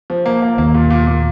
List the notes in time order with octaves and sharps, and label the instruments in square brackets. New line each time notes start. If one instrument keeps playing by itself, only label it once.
[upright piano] F3
A#3
A#3
[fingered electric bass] D#2 D#3 [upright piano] A#3
[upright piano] A#2
A#2
A#2